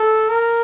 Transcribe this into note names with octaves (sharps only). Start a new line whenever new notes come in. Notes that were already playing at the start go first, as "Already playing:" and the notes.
Already playing: A4
A#4